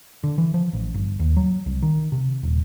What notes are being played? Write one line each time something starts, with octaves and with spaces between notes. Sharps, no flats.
D3
E3
F3
A1
G1
D#2
F#3
C2
D#3
C3
D#1